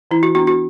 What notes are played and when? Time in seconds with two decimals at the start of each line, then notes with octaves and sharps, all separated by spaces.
0.11 E3 E4
0.23 F#4
0.35 B3 D4 F#4
0.47 F#4